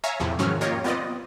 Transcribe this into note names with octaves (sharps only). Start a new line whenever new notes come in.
C#5 E5 F5 G#5 A#5
E2 A2 C3 F3
G#2 D#3 F3 F#3 C#4 F6
A#3 F4 G4 A#4 C#5 D#5
B3 C4 F4 D5 D#5